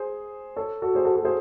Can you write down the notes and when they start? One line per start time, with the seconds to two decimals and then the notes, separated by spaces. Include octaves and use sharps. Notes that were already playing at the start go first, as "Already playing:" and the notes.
Already playing: G#4 C5
0.56 A4 C#5
0.82 F#4 A4
0.95 G#4 C5
1.05 F#4 A4
1.15 F#4 A4
1.25 G#4 C5